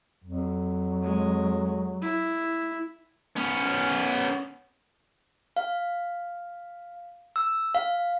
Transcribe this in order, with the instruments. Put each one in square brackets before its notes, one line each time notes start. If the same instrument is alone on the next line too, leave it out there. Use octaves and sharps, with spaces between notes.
[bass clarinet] F2 [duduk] F#3
[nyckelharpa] G#3
E4
[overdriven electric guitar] B3 C#4
[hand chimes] F5
E6
F5